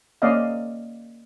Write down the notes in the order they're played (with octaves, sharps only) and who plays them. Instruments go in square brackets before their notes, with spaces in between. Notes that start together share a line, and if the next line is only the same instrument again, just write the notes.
[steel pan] A#3 C#4 D5 D#5 F5